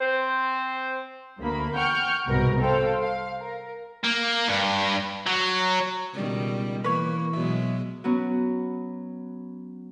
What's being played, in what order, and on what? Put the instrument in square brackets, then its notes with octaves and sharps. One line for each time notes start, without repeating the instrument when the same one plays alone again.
[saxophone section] C4 C5
[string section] D2 A#3 B5
F#5 G5 C#6 F6 G6
C2 G#2 B2 A#4 B4
A4 C5 F5 G5
F5
A#4
[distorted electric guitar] A#3
G2
F#3
[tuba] C#2 [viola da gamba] B2 D#3 G3
[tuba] E3 [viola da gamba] A#3 [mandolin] B4 C#5
[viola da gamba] B2 F#3 G#3 [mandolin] E5
[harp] F#3 B3 C#4